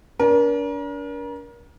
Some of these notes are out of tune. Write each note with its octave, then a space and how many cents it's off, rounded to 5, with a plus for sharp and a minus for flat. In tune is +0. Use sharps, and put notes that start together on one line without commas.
D4 -40 A#4 +35